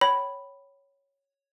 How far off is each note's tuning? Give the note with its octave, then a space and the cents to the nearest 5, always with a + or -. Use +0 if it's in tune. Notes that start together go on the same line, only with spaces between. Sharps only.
C#5 +0 G5 -35 B5 +0